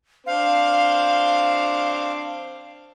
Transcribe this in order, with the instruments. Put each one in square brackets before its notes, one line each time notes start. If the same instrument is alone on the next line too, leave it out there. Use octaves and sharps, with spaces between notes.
[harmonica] C4 D4 C5 [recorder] F5